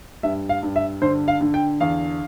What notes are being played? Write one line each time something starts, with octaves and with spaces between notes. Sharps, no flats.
G2 E5
F5
G2
E5
D3 C5
F5
D3
G5
E2 F5